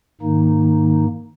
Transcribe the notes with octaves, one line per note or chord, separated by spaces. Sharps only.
G#2 D#3 A#3 D#4